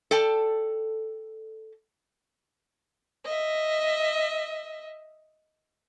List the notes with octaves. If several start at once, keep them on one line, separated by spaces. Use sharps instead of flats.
A4 D5 G5 A5
D#5 E5